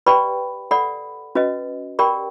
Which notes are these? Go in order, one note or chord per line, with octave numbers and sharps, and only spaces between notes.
G4 B4 D5 G5 B5
A4 D5 F#5 B5
C#4 F#4 B4 D#5
G4 A#4 D5 G5 B5